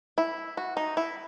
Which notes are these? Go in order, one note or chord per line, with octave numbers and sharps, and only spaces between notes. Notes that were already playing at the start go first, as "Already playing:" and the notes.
E4
F#4
D#4
E4